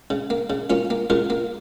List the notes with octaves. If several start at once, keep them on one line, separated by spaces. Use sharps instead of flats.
C#3
A#3
C#3
A#3 C#4 F4
A#3
C#3 F4 A#4
A#3